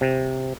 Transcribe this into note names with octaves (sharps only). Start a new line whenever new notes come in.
C3